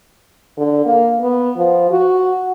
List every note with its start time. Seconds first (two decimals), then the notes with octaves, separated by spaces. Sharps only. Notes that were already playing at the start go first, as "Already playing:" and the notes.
0.57 D3
0.86 A#3
1.21 B3
1.57 F3
1.91 F#4